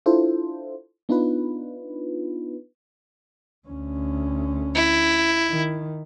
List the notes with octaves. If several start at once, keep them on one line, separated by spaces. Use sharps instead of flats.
D4 E4 F4 A4 C5
B3 D4 D#4 F4 B4
D2 C#4
E4
D#3